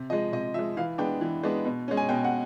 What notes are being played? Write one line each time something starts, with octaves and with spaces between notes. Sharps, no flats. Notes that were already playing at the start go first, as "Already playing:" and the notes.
Already playing: C3
F3 G#3 D#5
C3 D#5
F3 G#3 E5
E3 F5
G#3 B3 D4 G5
E3
G#3 B3 D4
B2
G#3 C#4
G#5
B2 G5
F#5